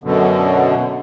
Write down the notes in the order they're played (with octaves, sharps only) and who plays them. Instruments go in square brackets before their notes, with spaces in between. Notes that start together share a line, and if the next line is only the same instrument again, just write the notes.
[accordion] F#2 B2 D3